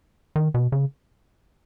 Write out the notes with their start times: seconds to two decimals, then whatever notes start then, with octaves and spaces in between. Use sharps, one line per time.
0.36 D#3
0.54 B2
0.72 C#3